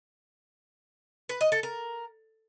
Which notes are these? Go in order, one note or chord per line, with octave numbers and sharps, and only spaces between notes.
B4
D#5
A4
A#4